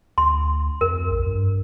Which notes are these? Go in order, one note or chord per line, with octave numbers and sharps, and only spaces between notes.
D2 C6
F2 A#4
A#1
G2